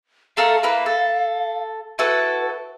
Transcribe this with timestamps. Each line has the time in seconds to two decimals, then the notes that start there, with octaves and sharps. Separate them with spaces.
0.37 A3 A4 A#4 F5
0.63 A#3 E4 B4
0.86 A4
1.99 E4 F#4 A4 B4